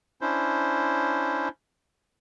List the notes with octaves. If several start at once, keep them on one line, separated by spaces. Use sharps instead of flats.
C#4 D4 E4 C5